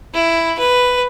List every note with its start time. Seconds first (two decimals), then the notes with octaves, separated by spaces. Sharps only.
0.14 E4
0.59 B4